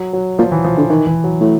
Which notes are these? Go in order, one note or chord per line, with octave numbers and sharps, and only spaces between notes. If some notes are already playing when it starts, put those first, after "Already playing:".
Already playing: F#3
F#3
A#2 F3
E3
F3
D3 E3
D#3 E3
E3
F#3
A2